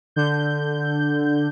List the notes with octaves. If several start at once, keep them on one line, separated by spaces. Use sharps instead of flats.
D3 G6